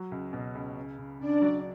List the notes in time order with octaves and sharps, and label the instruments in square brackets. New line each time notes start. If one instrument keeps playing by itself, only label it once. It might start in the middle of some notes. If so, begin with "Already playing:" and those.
Already playing: [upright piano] F#3
C#2
B2
C#2
C#3
C#3
[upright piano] C#3 [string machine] D4 D5
[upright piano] F#3